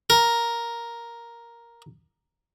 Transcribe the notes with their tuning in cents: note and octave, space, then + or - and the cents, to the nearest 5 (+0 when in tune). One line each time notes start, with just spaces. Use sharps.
A#4 +5